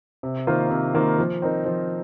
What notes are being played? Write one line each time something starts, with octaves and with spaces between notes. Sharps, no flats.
C3
D#3 A#3 F4 C5
C3
D#3 A#3 F4 C5
F3
C4 D#4 A#4
F3